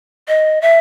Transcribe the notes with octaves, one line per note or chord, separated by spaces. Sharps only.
D#5
E5